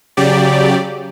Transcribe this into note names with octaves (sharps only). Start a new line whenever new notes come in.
C#3 F#3 G4 D5